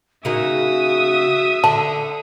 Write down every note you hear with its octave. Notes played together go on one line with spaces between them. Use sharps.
C#3 A#3 D#4 F#4 E5 D#6
D3 A5